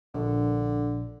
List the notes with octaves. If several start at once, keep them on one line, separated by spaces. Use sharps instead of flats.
A#1 D3